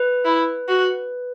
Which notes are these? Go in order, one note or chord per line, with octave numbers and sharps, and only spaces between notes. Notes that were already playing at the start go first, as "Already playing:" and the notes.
Already playing: B4
E4
F#4